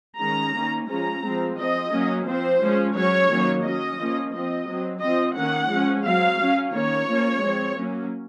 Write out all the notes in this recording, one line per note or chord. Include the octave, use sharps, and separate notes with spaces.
D#3 G#3 C#4 A#5
D#3 A#3 C#4
F3 G#3 C#4 A#5
F3 G#3 C4
F3 C4 D#5
F#3 A#3 C#4
F3 C4 C5
F3 G#3 C#4
F#3 C#4 C#5
D#3 F#3 A#3 C#4
F#3 C#4 D#5
F3 A#3 C#4
F3 C4 D#5
F#3 C4
F3 C4 D#5
D#3 A#3 C#4 F#5
F3 G#3 C#4
F#3 C4 F5
F#3 C#4
D#3 A#3 C#4 C#5
F3 A#3 C#4
F3 G#3 C4
F#3 A#3 C#4